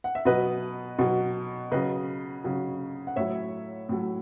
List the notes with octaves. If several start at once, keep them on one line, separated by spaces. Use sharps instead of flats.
F#5
E5
B2 F#3 B4 D#5
B2 F#3
C#3 F#3 B4 D#5
C#3 F#3
F#5
A2 F#3 C#5 E5
A2 F#3